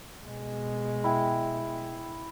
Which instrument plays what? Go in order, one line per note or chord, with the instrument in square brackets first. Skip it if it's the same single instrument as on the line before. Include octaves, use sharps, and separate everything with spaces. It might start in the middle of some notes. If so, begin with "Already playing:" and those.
[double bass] B2 G#3
[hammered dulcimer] E4 G5